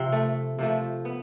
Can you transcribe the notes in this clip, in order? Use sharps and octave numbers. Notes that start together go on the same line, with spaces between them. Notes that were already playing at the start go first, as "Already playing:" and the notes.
Already playing: C3 F3 C4
A3
C3 F3 A3
B3